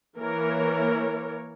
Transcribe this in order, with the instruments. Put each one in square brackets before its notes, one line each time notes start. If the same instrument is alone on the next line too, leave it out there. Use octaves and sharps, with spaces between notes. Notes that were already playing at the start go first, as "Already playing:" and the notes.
[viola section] E3 A#3 A#4 C#5